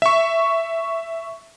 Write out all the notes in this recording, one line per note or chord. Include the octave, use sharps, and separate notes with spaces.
E5 C#6